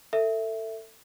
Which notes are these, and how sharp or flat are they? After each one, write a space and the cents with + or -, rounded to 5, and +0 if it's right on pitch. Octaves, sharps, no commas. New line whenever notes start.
A4 +25 E5 +0